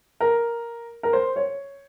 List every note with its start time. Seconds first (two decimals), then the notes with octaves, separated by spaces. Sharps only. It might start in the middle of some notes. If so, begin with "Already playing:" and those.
0.21 A#4
1.03 A#4
1.13 C5
1.36 C#5